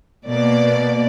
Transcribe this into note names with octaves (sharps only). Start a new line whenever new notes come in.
B2 A#3 D5